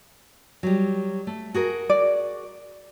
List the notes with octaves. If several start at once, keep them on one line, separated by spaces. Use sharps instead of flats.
F#3 G3
A3
F#4 G#4 A#4
D5